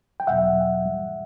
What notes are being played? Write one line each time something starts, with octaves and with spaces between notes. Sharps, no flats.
G5
E2 B2 F#3 E5 F#5
G#2 E3 G3